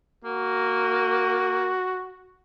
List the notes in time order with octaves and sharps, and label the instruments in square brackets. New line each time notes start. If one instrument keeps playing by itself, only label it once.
[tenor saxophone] A#3 [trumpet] F#4